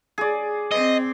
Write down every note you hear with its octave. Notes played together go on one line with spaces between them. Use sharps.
G#4 D5
C4 D#5